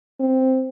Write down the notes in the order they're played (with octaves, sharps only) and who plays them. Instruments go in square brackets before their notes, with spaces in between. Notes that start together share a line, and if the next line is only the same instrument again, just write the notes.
[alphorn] C4